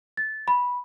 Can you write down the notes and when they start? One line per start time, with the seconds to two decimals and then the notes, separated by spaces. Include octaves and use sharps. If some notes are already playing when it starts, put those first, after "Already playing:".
0.17 A6
0.48 B5